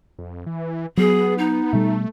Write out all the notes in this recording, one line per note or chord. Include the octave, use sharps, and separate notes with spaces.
F2
E3
F#3 B3 G#4
D#4
B2 G3 A3